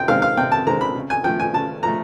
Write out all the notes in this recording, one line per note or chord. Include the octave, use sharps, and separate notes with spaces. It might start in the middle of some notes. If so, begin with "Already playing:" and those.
Already playing: C3 G5
D#3 G#3 C4 F5
F5
C3 G5
A5
D#3 G#3 C4 A#5
B5
C#3
G#5
F3 A3 G5
G#5
C#3 A5
F3 A3 A#5